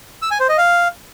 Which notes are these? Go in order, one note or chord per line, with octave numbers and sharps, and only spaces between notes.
E6
G#5
C5
D#5
F5